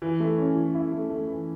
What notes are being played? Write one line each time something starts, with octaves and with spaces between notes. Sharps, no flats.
E3
A3
C#4
E3
E4
A3
A3
E3